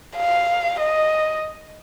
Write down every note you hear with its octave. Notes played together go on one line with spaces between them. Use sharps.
F5
D#5